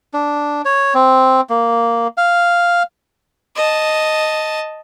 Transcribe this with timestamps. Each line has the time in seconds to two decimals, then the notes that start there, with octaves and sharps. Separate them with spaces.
0.14 D4
0.65 C#5
0.94 C4
1.50 A#3
2.17 F5
3.56 D#5 A5